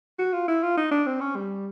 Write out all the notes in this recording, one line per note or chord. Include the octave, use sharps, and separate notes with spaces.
F#4
F4
E4
F4
D#4
D4
C4
C#4
G3